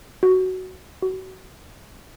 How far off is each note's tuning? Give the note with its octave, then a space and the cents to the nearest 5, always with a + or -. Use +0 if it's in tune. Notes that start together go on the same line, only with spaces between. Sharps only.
F#4 +10
F#4 +30